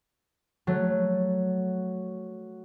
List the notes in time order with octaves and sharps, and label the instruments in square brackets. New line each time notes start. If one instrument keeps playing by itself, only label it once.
[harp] F#3 A3